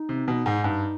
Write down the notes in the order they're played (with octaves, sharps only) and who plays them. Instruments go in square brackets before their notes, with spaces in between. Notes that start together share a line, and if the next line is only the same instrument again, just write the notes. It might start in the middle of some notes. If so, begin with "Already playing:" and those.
Already playing: [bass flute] D#4
[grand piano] C3
B2
G#2
[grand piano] G2 [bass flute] D#4